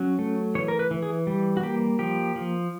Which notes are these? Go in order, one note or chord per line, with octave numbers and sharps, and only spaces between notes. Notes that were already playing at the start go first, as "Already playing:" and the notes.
Already playing: F#3 C#4
A3
E3 C#5
A#4
B4
E3
G#4
G3
F#4
A#3 G4
F3 G4
F3